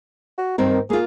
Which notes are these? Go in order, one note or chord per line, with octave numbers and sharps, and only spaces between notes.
F#4
G2 D#3 C4 A#4
A#3 F4 G#4